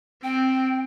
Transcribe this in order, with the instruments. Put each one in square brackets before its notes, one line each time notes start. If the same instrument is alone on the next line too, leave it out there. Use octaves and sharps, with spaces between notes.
[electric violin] C4 [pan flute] G5